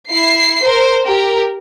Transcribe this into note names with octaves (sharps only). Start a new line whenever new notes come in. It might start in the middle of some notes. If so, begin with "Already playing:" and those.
E4 C7
A#4 C5
G4 A#4